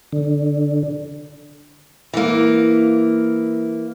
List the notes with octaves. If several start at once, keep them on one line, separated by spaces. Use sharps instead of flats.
D3
E3 A#3